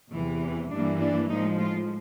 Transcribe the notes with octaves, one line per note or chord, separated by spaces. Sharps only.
E2 C3 E3
G2 E3 G3 A#3 D4
D4
A2 F3 G#3 D#4
F4